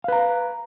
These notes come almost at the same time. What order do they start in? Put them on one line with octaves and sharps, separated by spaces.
F5 B4 A#5